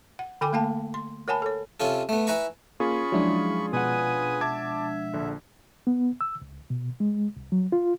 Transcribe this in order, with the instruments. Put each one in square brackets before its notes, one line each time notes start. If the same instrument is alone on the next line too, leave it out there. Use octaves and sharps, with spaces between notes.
[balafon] F#5
D3 A4 G5 G#5 B5 D6
A3 A#3 F5 G5 A5
C6
A#4 C#5 F#5 G#5 A5 B5
A4 C#5
[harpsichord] C3 C#4 F4 A4
A3 B3
E4 B4 G#5 A#5 C#6
[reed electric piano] A#3 [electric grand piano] C#4 F4 G#4 [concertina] B5 C#6
[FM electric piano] F3 G#3 D4 [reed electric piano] F#3 E4
[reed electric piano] B2 F#5 [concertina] B4 G#5 D#6
[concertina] E5 [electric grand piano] A5 D6 G#6
[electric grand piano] A#1 D3
[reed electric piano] B3
E6
C#2
B2
G#3
C2
F#3
F4